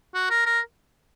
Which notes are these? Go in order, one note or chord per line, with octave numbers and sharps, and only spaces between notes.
F#4
A#4
A#4